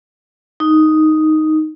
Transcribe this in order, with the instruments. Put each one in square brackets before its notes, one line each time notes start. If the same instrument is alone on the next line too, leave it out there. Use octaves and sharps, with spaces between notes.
[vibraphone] D#4